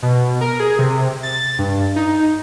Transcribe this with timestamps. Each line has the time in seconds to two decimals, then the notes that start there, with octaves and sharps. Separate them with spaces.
0.02 B2
0.41 A#4
0.60 G#4
0.79 C3
1.23 A6
1.59 G2
1.96 D#4